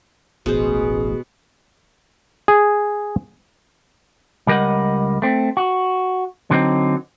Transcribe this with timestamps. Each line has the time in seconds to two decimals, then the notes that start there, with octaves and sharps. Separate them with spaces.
0.46 E1 A1 B2 G#3 G#4 C5
2.48 G#4
4.47 C#2 G3 A#4 D#5 F#5
5.22 A3 C4
5.57 F#4
6.50 D3 F#3 B3 C4 D#4